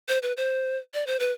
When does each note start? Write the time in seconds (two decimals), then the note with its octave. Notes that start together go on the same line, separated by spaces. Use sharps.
0.08 C5
0.23 B4
0.37 C5
0.94 D5
1.07 C5
1.20 B4